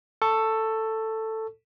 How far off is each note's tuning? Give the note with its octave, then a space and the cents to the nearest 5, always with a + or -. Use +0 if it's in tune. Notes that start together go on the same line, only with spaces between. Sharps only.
A4 +10 C#6 +0